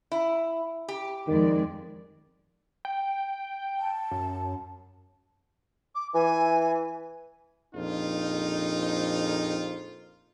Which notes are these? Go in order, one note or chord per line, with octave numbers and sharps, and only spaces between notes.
E4
G4
F2 D#3 G#3 D5
G5
A5
F#2
D6
E3 G#5
A#1 F2 D#4 F4